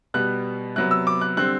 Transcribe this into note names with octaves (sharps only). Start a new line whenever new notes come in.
B2 G3 B3 F#6
C3 F#3 B3 F#6
E6
D6
F#6
D3 G3 C4 F#6